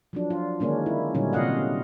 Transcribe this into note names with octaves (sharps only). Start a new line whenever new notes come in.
F3 F#3 D4
F4
D3 D#3 G#3 A#3 C#4 D4
E4
A#2 D3 F#3 G3 C#4 D#4
C3 F4 D#5 F5 F#5